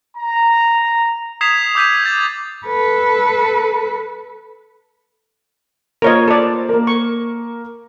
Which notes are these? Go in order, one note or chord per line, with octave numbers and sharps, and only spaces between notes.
A#5
D#6 G#6 B6 C7 E7 F7
D6 E6 G6 B6 C7 D#7
G#6 A6
A4 B4
A#3 F4 A#4 C5 C#5 D#5
A4 D5
A#3 A#4
C#6